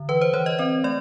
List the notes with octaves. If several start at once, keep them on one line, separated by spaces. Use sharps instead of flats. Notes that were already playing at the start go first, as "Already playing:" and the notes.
Already playing: D3
E3 B4
C5
E3 C#5
D#5
C4 D#5
A3 D5